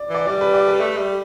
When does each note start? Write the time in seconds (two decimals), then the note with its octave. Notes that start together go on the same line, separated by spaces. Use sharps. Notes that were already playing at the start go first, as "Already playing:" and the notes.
Already playing: D5
0.09 E3
0.14 D5
0.27 G3 D5
0.41 B4
0.54 D5
0.68 B4
0.80 A3
0.98 G3